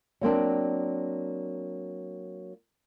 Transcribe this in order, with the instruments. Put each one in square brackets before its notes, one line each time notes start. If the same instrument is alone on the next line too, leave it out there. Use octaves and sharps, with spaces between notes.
[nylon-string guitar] F#3 A#3 C4 D4